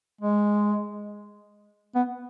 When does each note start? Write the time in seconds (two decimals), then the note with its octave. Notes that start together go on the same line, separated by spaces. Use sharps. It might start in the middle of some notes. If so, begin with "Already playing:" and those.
0.21 G#3
1.95 B3